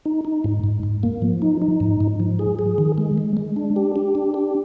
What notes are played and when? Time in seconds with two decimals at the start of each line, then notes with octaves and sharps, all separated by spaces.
0.05 D#4
0.25 D#4
0.44 G#2
0.64 G#2
0.83 G#2
1.03 A#3
1.22 F3
1.42 D#4
1.62 D#4
1.80 G#2
2.00 G#2
2.20 F3
2.39 G#4
2.59 G#4
2.78 D#3
2.98 G#3
3.18 G#3
3.37 G#3
3.56 D4
3.76 G4
3.96 G4
4.15 D4
4.34 G4